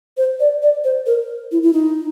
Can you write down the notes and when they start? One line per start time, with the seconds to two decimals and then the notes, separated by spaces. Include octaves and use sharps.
0.17 C5
0.40 D5
0.62 D5
0.84 C5
1.06 A#4
1.52 E4
1.63 E4
1.73 D#4